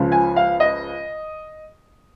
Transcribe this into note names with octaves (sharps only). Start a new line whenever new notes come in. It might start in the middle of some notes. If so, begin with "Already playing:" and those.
Already playing: C#2 C#3 F3
G#5
F5
D#5